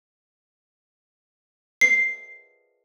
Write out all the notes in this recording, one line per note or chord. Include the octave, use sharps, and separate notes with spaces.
C7